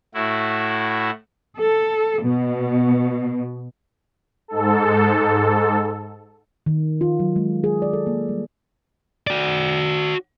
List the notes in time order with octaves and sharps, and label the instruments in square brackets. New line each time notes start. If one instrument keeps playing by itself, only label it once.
[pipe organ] A2 E4 F#4
[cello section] A4
B2
[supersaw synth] G#2 A4
[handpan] D#3
F4
F#3
G#3
G#4
D5
A4
A#3
G3
[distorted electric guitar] F#4 D5